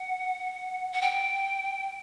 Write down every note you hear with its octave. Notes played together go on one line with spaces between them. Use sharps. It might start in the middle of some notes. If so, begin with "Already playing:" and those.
Already playing: F#5
F#5
G5